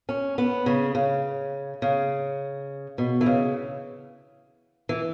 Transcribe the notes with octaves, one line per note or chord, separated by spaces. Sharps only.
C#4
B3
C#3
C#3
C#3
B2
E3
C#3
E3